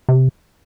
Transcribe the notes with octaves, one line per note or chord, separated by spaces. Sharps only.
C3